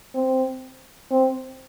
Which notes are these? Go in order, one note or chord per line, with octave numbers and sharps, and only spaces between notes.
C4
C4